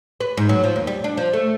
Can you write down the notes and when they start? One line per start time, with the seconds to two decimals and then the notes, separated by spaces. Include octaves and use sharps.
0.21 B4
0.37 G#2
0.49 F#3
0.64 F3
0.76 D#2
0.87 G3
1.04 D4
1.17 F3
1.33 A3